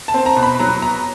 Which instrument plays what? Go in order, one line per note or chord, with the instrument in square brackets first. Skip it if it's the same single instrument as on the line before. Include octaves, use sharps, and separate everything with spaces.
[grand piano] A5
C4
A#5
B2
B5
F#3 A#5
B3 A#5